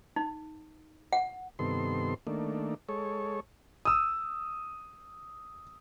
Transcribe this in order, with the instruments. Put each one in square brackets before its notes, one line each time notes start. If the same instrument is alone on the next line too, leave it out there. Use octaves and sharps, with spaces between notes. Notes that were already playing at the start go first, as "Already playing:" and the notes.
[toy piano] D#4
F#5
[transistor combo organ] G2 C3 D#3 B3 A4 C6
D#3 A3 A#3 D4
G#3 A4 C#5
[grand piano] D#6 E6